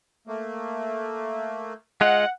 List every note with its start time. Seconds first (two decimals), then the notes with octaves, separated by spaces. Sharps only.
0.27 A3 A#3
2.01 G#3 F4 D#5 F#5